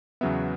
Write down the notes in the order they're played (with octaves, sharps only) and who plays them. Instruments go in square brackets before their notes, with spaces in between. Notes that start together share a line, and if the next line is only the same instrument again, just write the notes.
[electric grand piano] E2 C#3 F#3 B3 E5